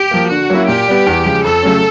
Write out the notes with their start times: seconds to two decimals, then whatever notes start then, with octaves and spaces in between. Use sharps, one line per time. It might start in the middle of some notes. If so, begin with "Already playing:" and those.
Already playing: G4
0.11 F3 A#3
0.31 D3 F#4
0.50 F#3 A#3 C#4 E4
0.68 A#2 G4
0.88 G3 B3
1.07 E2
1.25 C#3 F3 G#3
1.45 F2 A4
1.63 C#3 F#3 A3 C#4